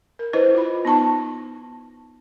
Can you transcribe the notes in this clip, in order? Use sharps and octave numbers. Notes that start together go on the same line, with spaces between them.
A#4
E4 B4 C5 D#5
F4 B5
B3 D#4 A5 C#6